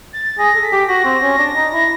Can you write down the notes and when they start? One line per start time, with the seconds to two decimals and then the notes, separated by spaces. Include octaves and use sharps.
0.13 A6
0.38 G#4 A#6
0.55 A4
0.63 B6
0.72 G4
0.88 F#4 A#6
1.05 C4
1.22 C#4
1.39 D4
1.56 D#4
1.73 E4